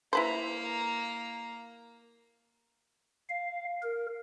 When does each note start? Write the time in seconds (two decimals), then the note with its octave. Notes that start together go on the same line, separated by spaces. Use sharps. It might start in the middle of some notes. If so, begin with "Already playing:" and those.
0.13 A#3 E4 B4 C5 A#5
3.29 F5
3.83 A#4